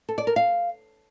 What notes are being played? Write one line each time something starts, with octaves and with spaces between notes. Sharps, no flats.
A4
D5
A#4
F5